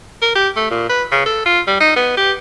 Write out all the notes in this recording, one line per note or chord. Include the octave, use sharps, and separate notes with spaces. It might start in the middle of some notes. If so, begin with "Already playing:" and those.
A#4
G4
A3
A#2
B4
C#3
A4
F4
G3
D#4
B3
G4